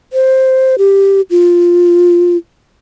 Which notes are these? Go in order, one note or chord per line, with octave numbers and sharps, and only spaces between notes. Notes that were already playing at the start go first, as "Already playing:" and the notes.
C5
G4
F4